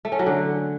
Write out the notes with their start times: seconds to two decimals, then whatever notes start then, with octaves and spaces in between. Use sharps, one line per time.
0.05 A3
0.12 C#4
0.19 F#3
0.26 D3